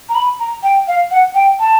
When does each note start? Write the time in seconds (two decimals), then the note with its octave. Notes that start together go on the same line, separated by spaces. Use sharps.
0.09 A#5
0.15 B5
0.40 A#5
0.63 G5
0.88 F5
1.11 F#5
1.35 G5
1.59 A5